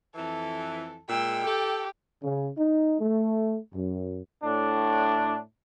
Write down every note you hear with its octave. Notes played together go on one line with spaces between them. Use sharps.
F2 E3 A4
A#2 G#3 G5 E6
G4 A4
C#3
D#4
A3
F#2
A2 D4